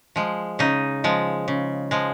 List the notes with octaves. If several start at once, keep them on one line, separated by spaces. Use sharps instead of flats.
F3 G#3
C#3 D#4
F3 G#3
C#3
F3 G#3